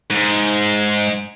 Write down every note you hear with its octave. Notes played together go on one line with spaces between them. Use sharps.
G#2